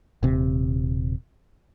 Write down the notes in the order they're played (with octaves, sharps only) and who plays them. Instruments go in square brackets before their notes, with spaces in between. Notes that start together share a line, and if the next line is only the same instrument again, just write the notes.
[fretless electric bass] D#1 C3